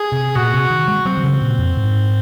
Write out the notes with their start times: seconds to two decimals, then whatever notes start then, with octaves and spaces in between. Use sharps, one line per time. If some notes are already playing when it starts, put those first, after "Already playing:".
Already playing: G#4
0.12 C3
0.35 A#2 F#4
0.53 C3
0.70 D#3
0.88 G#3
1.05 F#3 C4
1.17 D#3
1.23 C#3
1.41 A#2
1.58 F2
1.77 G#2